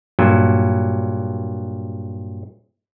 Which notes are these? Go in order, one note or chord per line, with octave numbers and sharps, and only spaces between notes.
G2 A#2 F#3